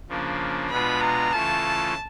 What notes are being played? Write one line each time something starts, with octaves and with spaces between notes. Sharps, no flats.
C#3 F3 A#3 D4
B2 G#3 B3 D4 F4 B5
A#5
C#3 E3 A3 C#4 F4 A5